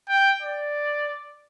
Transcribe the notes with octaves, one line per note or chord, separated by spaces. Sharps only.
G5
D5